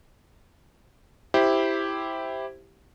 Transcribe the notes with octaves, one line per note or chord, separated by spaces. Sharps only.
E4 G4 C5